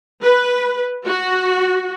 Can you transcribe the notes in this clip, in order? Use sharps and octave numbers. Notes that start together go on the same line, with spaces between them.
B4
F#4